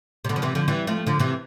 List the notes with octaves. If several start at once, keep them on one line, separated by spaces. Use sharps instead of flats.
C3
B2 D3
F3
C3 E3
D3 F3
E3 G3
F3 A3
D3 F3
C3 E3